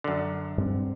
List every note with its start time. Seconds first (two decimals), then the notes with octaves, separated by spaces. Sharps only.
0.04 F#2 D3
0.58 G2 C4